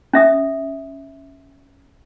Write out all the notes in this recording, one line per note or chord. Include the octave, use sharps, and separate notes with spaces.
C#4 E5 D#6